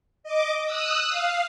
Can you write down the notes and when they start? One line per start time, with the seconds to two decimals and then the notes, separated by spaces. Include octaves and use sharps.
0.23 D#5 D6
0.63 D#6 E6 F#6
1.10 F5